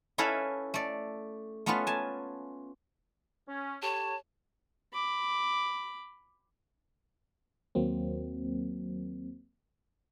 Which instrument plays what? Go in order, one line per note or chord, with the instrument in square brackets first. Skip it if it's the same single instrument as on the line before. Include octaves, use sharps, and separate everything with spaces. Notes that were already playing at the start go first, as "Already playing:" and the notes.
[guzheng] C#4 E4 A4 B4 E5 F5
A3 D5
A3 B3 C#4 F4 B4
G#5 A5
[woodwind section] C#4
[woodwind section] G4 A4 C#5 [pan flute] A5
[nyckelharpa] B5 D6
[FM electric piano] D#2 F#3 A#3 C4